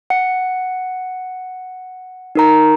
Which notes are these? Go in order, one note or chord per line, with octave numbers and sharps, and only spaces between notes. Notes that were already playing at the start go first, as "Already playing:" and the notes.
F#5 C#7
D#4 A#4 A#5